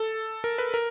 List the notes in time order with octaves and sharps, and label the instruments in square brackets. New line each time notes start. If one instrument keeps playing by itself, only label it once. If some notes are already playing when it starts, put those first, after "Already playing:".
Already playing: [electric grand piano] A4
A#4
B4
A#4